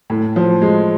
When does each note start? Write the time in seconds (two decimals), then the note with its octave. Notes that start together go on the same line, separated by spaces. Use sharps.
0.10 A2
0.36 F3
0.62 G#3